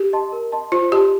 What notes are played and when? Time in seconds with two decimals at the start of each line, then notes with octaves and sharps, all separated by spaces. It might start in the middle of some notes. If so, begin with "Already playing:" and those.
Already playing: G4
0.13 D#5 A5 C6
0.32 A#4
0.52 D#5 A5 C6
0.72 F4 C5
0.92 G4 D#5 A5 C6